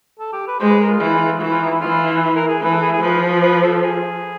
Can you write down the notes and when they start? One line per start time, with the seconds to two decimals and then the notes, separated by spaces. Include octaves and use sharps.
0.19 A4
0.33 G4
0.48 B4
0.60 G#3 C5
0.70 B4
0.81 A#4
0.90 F4
1.01 E3
1.40 E3 F#4
1.51 F4
1.62 D#4
1.72 E4
1.81 E3 F4
2.22 B4
2.36 A#4
2.48 G#4
2.62 E3 B4
2.72 A4
2.82 G#4
2.93 G#4
3.02 F3 B4
3.42 B4
3.62 A4
3.83 G#4